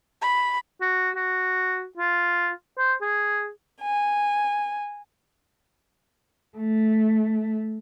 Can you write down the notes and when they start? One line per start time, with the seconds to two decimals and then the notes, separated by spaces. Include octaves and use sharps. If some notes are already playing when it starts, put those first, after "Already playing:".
0.22 B5
0.81 F#4
1.16 F#4
1.97 F4
2.78 C5
3.02 G#4
3.82 G#5
6.57 A3